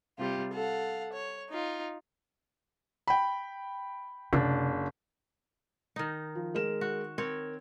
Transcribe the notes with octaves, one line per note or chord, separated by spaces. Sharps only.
C3 G3 F4 G4
A4 F5 F#5
C#5
D#4 F4
G5 B5
F#1 C3 D4
D#3 D#4
F3
G#3 A#4 E7
F#4
C4 A#4 C#5